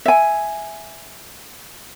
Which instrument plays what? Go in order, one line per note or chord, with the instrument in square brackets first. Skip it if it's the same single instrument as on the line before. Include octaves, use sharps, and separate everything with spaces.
[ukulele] E5 G#5